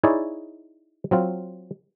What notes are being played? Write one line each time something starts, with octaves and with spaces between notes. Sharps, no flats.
D#4 E4 G#4 C#5 D5
F#3 C4 F4